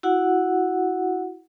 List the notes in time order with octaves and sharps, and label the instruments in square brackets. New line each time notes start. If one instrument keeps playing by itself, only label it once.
[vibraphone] E4 F#4 F#5